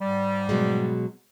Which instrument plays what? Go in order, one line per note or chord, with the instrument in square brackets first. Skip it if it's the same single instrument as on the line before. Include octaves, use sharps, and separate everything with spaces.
[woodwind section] G#2 G3
[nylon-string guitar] B2 F#3 G#3